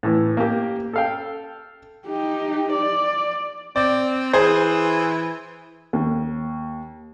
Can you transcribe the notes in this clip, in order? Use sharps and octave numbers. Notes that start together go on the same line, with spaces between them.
A2 E3
A#3 G4
A4 F5 G5
D#4 G4
D5
C4 D5
E3 G#4 C5
D#2